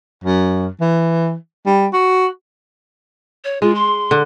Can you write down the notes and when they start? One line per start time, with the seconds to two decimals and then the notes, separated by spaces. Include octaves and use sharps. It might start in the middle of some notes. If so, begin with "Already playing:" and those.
0.24 F#2
0.80 E3
1.66 G3
1.93 F#4
3.44 C#5
3.62 G#3 F4
3.75 C6
4.11 D3